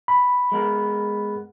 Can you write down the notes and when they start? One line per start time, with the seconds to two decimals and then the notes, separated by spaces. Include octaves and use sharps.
0.08 B5
0.52 G#3 B3 A#4